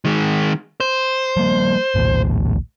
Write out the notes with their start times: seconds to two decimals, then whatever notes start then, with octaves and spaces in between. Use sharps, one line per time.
0.05 D#3 G#3
0.80 C5
1.37 F3 G3 A#3
1.95 A#1 D#2 A2